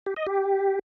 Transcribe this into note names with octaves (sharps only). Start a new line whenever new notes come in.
G4
D#5
G4